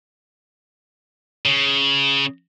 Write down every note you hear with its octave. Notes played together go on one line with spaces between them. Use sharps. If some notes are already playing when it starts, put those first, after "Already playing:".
C#3